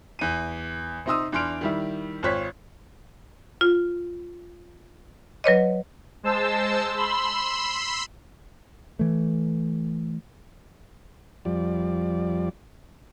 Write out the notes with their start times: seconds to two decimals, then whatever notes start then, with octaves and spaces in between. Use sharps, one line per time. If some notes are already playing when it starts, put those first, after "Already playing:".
0.19 E2 D#7
1.06 C3 C4 D#4 C6 D#6 E6
1.32 E2 D4 C6 F6 D7 F7
1.61 D#3 G3 E4
2.23 G#1 F4 C5 C#5 F#6 B6
3.61 F4
5.44 F#3 B4 C#5 D#5
6.23 G#3 C5 A5 E6
6.97 B5 C6 E6
8.99 E3 A3
11.45 F2 F3 G3 D5